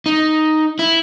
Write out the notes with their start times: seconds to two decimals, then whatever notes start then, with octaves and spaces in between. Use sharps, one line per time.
0.06 D#4
0.79 E4